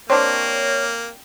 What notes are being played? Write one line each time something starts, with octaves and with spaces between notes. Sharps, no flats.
A#3 C4 D4 G4 C#5